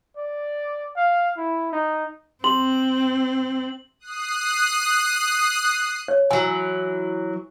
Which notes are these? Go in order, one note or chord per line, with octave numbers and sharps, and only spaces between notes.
D5
F5
E4
D#4
C4 C6 F#7
D#6 F#6 C7
C#5
E3 F#3 G#5